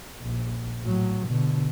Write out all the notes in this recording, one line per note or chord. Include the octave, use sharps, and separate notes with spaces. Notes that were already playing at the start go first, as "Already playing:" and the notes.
A#1
A2 F#3
B2 D3